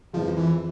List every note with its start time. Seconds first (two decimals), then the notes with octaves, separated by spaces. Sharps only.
0.13 F2 E3 F3 G#3
0.37 E3